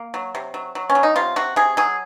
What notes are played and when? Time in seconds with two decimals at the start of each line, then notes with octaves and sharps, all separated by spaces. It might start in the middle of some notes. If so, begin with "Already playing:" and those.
Already playing: A#3
0.14 F#3
0.35 C3
0.54 F#3
0.75 F#3
0.90 C#4
0.95 F#3
1.03 D#4
1.16 C3 F4
1.36 C3 F#4
1.56 C3 G#4
1.77 F#3 G#4